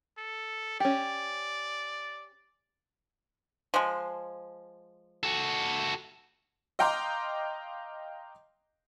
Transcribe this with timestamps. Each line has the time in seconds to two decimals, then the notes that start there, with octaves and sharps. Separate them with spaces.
0.18 A4
0.80 C#4 G4 D5
3.74 F3 G#3
5.23 F#4 A4
6.79 D#5 F5 G5 A#5 C6 D6